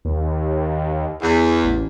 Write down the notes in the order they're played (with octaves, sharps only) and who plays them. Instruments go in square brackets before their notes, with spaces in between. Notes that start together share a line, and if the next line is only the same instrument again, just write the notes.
[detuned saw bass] D#2
[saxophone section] E2
[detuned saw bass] A1